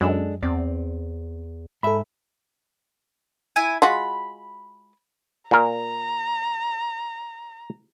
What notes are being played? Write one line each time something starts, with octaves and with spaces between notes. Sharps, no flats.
F#2 G#3 D4 A4
E2 C4 D5
G#2 A4 E5 B5
E4 G#5
G#3 F4 F#4 B5
A#2 A#4 A#5